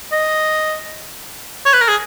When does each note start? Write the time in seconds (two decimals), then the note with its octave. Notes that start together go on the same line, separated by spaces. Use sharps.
0.12 D#5
1.65 C#5
1.73 B4
1.81 A#4
1.88 G#4